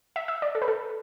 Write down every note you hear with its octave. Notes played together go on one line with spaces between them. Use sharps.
E5
E5
D5
A4
B4
A4